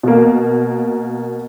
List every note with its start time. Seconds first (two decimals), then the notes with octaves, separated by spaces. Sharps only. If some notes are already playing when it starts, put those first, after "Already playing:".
0.03 B2 A#3